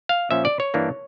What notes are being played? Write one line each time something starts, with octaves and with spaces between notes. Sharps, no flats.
F5
A#2 F3 C#4 E5
D5
C#5
G2 E3 G3 A#3 D4